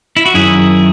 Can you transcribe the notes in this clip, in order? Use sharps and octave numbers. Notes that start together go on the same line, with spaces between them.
E4
F#4
F#2 D#3 E4 G#4